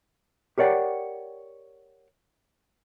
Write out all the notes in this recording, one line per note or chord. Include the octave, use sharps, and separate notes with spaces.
G4 A#4 C#5 D5 F#5 G5